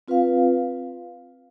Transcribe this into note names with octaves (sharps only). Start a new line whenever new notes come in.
C4 F4 B4 F5